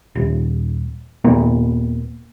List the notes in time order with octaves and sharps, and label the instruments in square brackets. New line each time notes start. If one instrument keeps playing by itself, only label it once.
[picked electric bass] D#1
D#2 A#2 A#3 B3